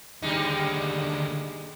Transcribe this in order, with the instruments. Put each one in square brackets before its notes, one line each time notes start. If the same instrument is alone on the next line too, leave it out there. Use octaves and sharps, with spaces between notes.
[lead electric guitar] D#2 D3 [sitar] G3 G#3 D#4